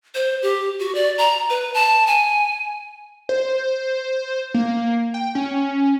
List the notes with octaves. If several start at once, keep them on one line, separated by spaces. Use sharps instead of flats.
C5
G4
F#4
D5
A#5
B4
A5
G#5
C5
A#3
G5
C#4